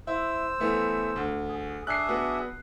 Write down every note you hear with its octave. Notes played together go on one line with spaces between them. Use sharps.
E4 C5 E6
E3 A3 B3
D2
G#4
D4 G#4 E5 F#6 C7
B3 F#4